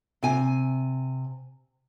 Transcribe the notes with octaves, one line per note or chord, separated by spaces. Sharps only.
C3 G#5